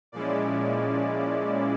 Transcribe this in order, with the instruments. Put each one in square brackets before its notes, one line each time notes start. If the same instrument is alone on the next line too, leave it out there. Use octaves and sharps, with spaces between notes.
[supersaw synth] A#2 F3 G#3 C#4 E4 D5